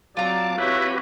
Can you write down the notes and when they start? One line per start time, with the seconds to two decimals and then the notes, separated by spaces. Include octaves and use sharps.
0.17 F#3 C4 F4 D5 A5 A#5 D6
0.58 C4 E4 F#4 G4 B4 C#5